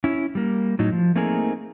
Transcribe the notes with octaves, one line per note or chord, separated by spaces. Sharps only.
C#4 E4
G3 A#3
A2 F#3 D#4
F3
A3 A#3 C4 D#4 G#4 A#4